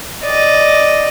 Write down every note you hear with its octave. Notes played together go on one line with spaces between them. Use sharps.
D5 D#5